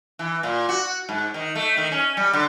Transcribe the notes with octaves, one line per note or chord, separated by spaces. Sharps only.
E3
A#2
F#4
G#2
D#3
A3
D#3
C#4
G3
D3